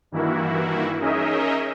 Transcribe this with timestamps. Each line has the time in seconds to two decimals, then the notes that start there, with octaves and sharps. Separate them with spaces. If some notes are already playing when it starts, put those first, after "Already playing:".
0.12 G2 D#3 E3 A#3 E4 F#4
1.01 C#4 D#4 G#4 A#4 D#5 E5